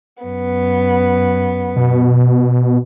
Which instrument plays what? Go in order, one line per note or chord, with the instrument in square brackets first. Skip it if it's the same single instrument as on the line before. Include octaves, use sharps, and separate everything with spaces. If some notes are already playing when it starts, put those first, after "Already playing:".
[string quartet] F#2 B3
[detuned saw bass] B2